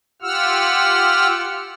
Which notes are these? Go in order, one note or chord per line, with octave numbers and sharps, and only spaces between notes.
F4 G4 F#5 E6 F6